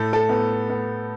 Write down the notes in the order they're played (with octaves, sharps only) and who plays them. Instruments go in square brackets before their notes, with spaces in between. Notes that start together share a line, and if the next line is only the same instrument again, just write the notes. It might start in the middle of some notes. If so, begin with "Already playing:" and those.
Already playing: [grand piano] A2 [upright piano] A4
[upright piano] A4
[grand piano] B3
B3